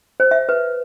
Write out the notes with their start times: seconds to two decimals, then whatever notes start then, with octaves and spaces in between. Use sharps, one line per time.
0.20 C5
0.31 E5
0.49 B4